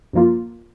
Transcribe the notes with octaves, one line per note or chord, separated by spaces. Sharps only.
F#2 F3 A#3 F4